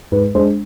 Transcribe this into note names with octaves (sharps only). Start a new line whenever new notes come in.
G#2 B4
G#3 D4 C5